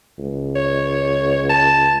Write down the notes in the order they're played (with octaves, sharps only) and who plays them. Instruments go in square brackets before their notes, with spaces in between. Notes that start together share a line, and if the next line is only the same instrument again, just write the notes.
[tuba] C#2
[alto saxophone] C#5
A5